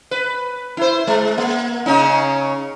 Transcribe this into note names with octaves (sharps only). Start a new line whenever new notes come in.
B4
E4 C5
G#3
A#3
C#3 C#4 D#4